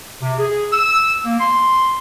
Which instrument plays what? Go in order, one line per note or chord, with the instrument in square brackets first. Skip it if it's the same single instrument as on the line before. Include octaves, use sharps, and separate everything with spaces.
[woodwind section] C3
G#4
E6
A#3
C6